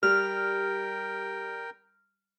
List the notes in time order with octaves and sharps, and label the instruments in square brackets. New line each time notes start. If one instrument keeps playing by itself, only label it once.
[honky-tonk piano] G3 [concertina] A#4 G5 [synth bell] F6